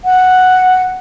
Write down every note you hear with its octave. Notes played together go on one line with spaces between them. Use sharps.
F#5